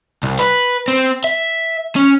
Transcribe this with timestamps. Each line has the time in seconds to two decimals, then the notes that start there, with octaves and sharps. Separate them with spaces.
0.23 C2
0.39 B4
0.88 C4
1.24 E5
1.96 C#4